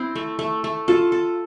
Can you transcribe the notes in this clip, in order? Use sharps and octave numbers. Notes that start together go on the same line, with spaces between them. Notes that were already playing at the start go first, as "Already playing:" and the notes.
Already playing: C4 E4
A3
A3
A3
F4 A4
A4